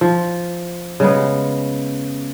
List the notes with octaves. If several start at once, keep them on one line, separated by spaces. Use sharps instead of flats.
F3
C#3 G#3 B3